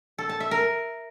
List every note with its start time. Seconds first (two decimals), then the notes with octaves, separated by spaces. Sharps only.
0.18 A4
0.29 A5
0.40 E5
0.51 A#4